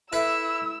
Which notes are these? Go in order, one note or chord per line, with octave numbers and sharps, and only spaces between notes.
E4 A4 B4 E5 E6